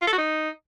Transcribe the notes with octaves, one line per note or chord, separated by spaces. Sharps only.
F4
A4
F#4
D#4